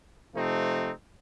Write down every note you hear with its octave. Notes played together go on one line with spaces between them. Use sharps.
C3 F3 A3 C4 D#4